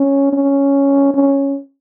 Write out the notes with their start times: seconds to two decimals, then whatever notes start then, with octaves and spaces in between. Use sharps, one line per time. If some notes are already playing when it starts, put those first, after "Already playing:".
Already playing: C#4
0.33 C#4
1.14 C#4